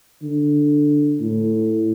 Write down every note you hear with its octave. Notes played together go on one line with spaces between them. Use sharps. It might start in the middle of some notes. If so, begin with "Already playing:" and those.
D3
A2